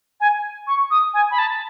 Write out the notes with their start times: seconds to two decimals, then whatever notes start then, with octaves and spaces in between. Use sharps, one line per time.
0.21 G#5
0.67 C#6
0.91 D#6
1.14 G#5
1.31 B5
1.39 A5